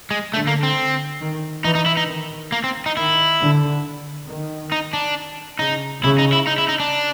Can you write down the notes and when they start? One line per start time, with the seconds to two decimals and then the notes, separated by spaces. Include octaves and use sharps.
0.11 G#3
0.34 D3 A3
0.47 A#3
0.63 C4
1.21 D#3
1.64 E3 D#4
1.75 D#4
1.86 E4
1.97 D#4
2.08 D#3
2.52 A#3
2.64 C4
2.86 D#4
2.96 D#3 E4
3.40 D3
4.27 D#3
4.72 D#4
4.93 D4
5.59 C#3 D#4
6.03 C#3 E4
6.19 D#4
6.33 E4
6.47 D#4
6.58 E4
6.69 D#4
6.80 D4